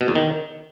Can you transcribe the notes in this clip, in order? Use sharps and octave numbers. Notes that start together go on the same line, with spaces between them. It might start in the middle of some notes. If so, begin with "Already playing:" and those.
B2
E2
D#3